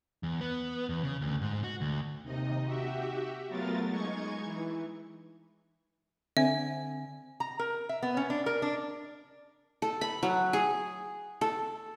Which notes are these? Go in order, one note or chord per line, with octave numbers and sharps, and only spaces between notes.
E2
B3
E2
C#3
D2
G#2
F#4
D2
D#2 C3 D#4 D#5
F#4 G4 E5
F#3 A3 B3 F4 A#4 A6
G#3 D#4 C#6 G#6
E3
D3 C4 E5 G#5
A#5
A#4
E5
B3
C#4
D4
A#4
D4
A4
B5
F#3
G#4
A4